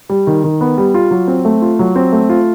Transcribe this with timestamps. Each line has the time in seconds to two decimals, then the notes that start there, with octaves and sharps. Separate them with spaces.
0.09 G3
0.27 D#3
0.44 D#3
0.61 B3
0.78 G3
0.94 F4
1.11 F#3
1.28 C4
1.45 A3
1.62 F4
1.79 F#3
1.96 C4
2.12 A3
2.30 F4